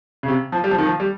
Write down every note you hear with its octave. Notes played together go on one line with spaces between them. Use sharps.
C#3
C3
F3
G3
F3
D#3
F3
G3